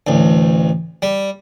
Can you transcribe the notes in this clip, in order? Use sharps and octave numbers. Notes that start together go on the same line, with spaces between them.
A1 D2
G3